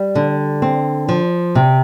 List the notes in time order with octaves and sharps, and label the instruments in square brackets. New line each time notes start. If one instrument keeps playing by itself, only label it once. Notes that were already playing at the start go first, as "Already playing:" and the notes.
Already playing: [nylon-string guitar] G3
D3
C4
F3
C3